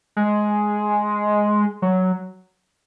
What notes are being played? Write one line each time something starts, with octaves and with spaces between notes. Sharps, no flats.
G#3
F#3